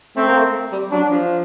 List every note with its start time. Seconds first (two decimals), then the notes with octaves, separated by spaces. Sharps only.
0.16 A3 C4
0.27 A#3
0.37 A3
0.72 G3
0.91 F#3 D4
1.10 F3